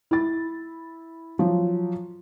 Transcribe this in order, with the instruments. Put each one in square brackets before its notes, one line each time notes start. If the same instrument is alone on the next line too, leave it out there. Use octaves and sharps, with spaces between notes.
[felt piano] E4 A6
F3 F#3